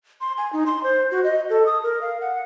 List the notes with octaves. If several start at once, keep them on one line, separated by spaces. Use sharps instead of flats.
C6
G#5
D#4
C6
C5
F#4
D#5
A4
D#6
A#4
F5
F#5